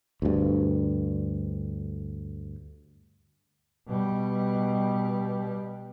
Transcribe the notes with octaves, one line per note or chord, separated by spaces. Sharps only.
D2 G2
B2 G3